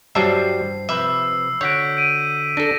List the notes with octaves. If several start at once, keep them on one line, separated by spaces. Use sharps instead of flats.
G2 F#3 G3 C5 E5 A5 C7
C3 F3 B4 E5 E6
D3 F#4 C#5 G6 B6 D7
D7 D#7
D4 A4 A#6